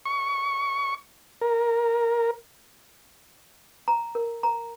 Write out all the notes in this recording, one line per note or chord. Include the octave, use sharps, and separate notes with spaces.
C#6
A#4
A#5
A#4
A#5